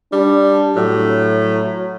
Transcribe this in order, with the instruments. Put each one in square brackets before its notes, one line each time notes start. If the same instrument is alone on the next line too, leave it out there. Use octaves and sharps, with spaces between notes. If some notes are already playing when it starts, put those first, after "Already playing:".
[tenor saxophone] G3 [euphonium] D4
[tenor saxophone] A2 [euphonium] F#3